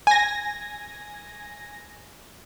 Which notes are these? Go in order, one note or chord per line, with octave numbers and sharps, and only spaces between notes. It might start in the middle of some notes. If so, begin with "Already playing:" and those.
G#5 A#6